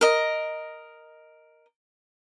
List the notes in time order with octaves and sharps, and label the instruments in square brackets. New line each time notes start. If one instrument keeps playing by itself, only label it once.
[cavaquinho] A#4 D#5